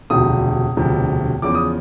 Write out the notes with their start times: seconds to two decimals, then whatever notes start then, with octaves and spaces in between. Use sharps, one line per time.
0.10 E1 D2 C3 F3 D#6
0.77 E1 D2 C3 F3
1.42 E2 C#3 F3 D6
1.55 D#6